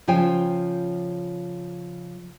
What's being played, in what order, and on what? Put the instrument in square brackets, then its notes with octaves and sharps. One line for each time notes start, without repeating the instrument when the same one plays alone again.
[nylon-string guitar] C#3 F3 C5 G5 G#5